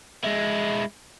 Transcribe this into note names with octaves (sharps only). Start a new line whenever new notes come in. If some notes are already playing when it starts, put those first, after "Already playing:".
G#3 E4